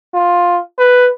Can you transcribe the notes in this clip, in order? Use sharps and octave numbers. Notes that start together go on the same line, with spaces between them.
F4
B4